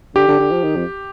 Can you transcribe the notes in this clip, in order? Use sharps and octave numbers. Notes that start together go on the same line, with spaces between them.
D3 G4
D3
D3
F3
D#3
F2